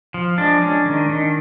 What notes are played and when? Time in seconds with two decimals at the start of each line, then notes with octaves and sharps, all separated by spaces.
0.14 F3
0.38 G#3 D4
0.62 C#4
0.86 D#3
1.10 D#3